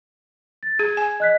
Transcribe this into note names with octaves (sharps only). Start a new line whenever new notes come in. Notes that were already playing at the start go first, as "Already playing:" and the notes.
A6
G#4 G#6
G#5
D#5 F#6 B6